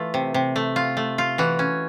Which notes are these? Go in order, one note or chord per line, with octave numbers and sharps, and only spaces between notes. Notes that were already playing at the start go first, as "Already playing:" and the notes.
Already playing: E3 A3 F4
C3
C3
A3
F4
A3
F4
E3 F#4
C#4